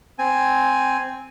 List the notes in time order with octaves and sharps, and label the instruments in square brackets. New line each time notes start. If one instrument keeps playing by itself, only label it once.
[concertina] C4 G#5